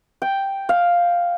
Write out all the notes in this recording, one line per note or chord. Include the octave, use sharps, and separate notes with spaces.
G5
F5